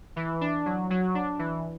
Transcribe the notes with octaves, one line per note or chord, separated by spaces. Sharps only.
E3
D4
F#3
F#3
D4
E3